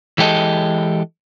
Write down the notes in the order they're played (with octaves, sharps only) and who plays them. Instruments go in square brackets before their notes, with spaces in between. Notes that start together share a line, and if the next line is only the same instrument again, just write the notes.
[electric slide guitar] E3 G#3 G4 A4 D#5